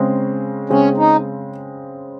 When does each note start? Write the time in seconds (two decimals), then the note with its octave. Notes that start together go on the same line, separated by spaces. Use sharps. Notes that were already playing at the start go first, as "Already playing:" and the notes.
Already playing: C#3 G#3 C4
0.70 C#3 G#3 C4 C#4
0.97 D#4